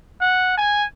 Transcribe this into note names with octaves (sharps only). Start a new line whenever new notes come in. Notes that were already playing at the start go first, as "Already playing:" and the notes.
F#5
G#5